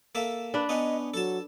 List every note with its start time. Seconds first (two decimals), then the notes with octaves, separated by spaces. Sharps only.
0.15 A#3 A4 E5
0.54 D4 B4
0.69 B3 C#4 D#4 D#5
1.14 F#3 A4 A5